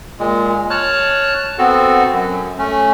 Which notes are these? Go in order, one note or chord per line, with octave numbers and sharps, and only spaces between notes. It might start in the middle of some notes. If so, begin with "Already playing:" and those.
A#2 G#3
C#5 A5 F6 F#6
B3 C4 F#4 A4
F#2
A3 C#4